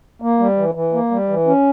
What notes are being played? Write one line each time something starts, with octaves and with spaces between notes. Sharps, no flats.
A#3
G3
E3
E3
A#3
G3
E3
C#4